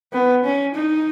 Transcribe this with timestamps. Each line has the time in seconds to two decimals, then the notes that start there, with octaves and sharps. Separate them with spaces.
0.13 B3
0.44 C#4
0.75 D#4